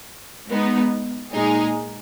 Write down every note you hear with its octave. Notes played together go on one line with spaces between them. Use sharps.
G#3 B3 D#4
A#2 G#3 D#4 G#4